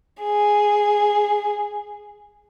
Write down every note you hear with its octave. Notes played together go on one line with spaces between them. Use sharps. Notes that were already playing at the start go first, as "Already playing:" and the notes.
G#4